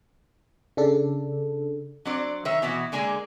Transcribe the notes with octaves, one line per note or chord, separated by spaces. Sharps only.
C#3 D4 A4
F#3 C4 D4 C5 D5
D#3 B4 C#5 E5
B2 E3 B3 E4 F#4
D3 G#3 A#3 G#4 D5 G#5